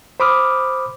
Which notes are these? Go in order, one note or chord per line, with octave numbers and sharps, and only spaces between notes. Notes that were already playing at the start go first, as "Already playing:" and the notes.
C5 B5 D6 D#6 F6